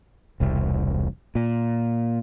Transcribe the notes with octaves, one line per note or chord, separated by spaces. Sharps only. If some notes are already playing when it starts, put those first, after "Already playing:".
E1 C2
A#2